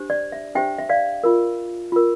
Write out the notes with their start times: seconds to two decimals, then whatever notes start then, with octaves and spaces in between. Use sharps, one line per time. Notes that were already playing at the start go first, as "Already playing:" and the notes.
Already playing: D4 G4 C5
0.10 D5
0.32 E5
0.55 D4 G4 C5 E5 G5
0.78 E5
0.89 D5 F5
1.24 F4 A#4
1.92 F4 A#4